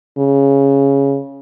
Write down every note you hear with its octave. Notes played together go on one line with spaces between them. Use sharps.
C#3